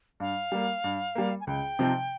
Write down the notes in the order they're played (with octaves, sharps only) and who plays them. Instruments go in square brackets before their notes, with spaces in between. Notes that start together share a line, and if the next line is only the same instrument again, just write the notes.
[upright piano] G2 [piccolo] F5
[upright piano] G3 A#3
G2
G3 A#3
[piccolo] G#5
[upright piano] C#2 [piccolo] G5
[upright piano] C3 F3 C4 D#4